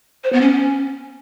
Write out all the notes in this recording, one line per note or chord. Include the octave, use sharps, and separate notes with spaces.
C5
B3
C#4